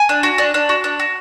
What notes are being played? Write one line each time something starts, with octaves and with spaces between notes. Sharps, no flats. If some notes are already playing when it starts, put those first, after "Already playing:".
Already playing: G#5
D4
F#4
D4
D4
F#4
D4
F#4